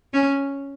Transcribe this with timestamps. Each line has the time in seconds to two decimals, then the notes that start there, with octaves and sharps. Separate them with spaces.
0.14 C#4